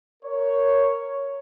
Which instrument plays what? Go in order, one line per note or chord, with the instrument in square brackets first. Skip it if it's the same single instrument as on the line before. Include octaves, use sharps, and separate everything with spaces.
[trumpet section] A#4 C#5